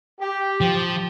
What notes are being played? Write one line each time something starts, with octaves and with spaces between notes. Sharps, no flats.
G4
F3